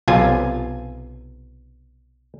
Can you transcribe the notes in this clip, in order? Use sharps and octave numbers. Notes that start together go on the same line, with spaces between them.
B1 C3 F4 G#5